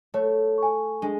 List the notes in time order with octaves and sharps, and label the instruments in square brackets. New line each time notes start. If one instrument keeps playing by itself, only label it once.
[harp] A3 [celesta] C#5
[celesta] G#5 C#6
[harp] G#3 [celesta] D4